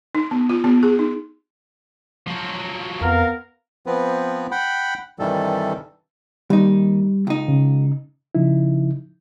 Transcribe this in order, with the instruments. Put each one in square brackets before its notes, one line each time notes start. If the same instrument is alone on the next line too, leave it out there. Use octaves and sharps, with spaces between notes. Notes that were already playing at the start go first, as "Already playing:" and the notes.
[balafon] D#4
B3
F4
B3
G#4
D#4
[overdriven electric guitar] F3 F#3
[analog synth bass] F2 [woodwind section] B3 A#4 [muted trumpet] F5
[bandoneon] F3 B3 C4 B4
F#5 G5 B5
G2 C3 D#3 E3 G3 A4
[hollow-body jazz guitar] D#2 D#4 [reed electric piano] G3
[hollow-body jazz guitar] C#2 D#4
[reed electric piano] C#3
C#3 F3 D#4 E4